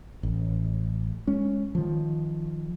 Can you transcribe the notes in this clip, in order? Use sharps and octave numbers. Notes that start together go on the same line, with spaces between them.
A1
G#3 C#4
D#3 F3